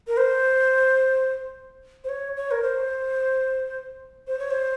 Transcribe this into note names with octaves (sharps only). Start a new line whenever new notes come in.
A#4
C5
C5
C#5
C#5
A#4
C5
C5
C#5
C5